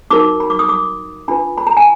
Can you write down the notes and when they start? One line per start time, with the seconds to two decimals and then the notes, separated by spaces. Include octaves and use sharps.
0.11 D#4 F#4 A#4 D6
0.40 B5
0.50 D6
0.59 D#6
0.69 D6
1.28 D4 F4 B4 B5
1.58 B5
1.67 A#5
1.77 G#5